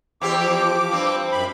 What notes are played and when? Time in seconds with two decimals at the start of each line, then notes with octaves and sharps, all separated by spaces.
0.21 E2 C4 G4 D6
0.38 F3 D6
0.91 G2 C4
1.32 F#2 B5